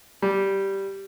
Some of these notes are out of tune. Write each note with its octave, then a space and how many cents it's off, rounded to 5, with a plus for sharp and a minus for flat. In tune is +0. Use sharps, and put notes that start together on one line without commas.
G3 -5